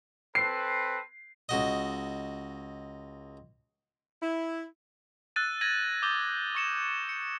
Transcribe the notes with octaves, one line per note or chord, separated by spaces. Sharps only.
C4 A4 B4 C7
C#2 F#4 D#5
E4
E6 F#6 A6 D#7
G#6 A#6 D#7 F#7
D6 D#6 G6 G7
C#6 C#7 E7
C#7